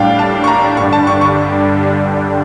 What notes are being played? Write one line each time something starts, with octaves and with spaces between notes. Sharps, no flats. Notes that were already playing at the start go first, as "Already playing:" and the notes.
Already playing: A2 G3 D4 F5 G5
A5
C#6
A#5
G2 D3 G3 D4 C#6
A5
C#6
C#6